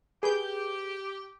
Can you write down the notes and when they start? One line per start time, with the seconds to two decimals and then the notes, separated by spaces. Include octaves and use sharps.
0.23 G4 G#4 B4 G6